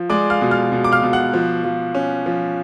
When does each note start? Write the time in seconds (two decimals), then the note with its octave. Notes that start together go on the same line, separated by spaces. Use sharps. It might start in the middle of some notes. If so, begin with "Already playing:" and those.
Already playing: F3
0.10 G#3 D5 D6
0.30 F5 F6
0.41 B2
0.51 F5 F6
0.72 B2
0.84 D6
0.92 F5 F6
1.02 B2
1.13 F#5 F#6
1.33 F3
1.64 F3
1.95 C#4
2.26 F3